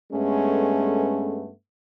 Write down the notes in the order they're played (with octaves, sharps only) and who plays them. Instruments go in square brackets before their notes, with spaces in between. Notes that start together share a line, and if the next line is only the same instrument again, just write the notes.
[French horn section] G2 G#3 A3 B3 C#4 A4